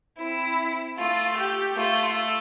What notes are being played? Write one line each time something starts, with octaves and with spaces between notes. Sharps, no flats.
C4 E4
A3 F4
G4
A3 F4